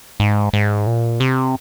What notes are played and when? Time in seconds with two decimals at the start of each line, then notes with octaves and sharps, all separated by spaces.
0.20 G#2
0.53 G#2
0.87 A#2
1.20 C3